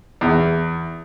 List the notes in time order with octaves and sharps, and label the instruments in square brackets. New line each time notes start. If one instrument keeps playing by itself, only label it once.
[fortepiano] E2